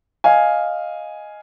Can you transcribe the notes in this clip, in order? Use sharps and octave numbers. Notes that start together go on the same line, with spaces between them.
D#5 F5 G#5